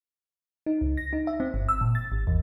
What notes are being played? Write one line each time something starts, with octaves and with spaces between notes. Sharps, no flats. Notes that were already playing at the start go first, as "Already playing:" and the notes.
D#4
C#2
A#6
D#4
E5
C4
G1
E6
A#2
A6
G#1
E2